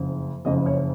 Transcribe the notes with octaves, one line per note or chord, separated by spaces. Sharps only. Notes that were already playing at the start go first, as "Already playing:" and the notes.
Already playing: F#1 F2 C#3
F#1 F2 C#3 D#5
C#5